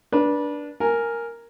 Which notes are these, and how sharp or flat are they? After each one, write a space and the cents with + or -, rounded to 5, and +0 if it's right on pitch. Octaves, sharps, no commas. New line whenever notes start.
D4 -5 B4 -30
A#4 +0 G#5 +0